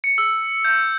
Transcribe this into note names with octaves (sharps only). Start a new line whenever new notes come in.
C#7
E6
G6